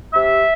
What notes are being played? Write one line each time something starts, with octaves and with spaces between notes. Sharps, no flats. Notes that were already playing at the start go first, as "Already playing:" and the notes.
C3 E5